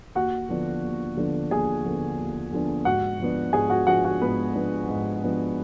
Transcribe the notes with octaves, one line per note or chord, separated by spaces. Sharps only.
D#2 F#4 F#5
D3 F3 B3 D4
D#2
D3 F3 B3 D4
D#2 G#4 G#5
D3 F3 B3 D4
D#2
D3 F3 B3 D4
G#2 F#4 F#5
F3 B3 D4
G#2 G#4 G#5
F#4 F#5
F3 B3 D4 F#4 F#5
F#4 F#5
G#2 B3 B4
F3 B3 D4
G#2
F3 B3 D4